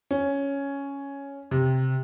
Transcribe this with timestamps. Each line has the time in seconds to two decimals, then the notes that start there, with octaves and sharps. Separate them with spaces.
0.11 C#4
1.51 C3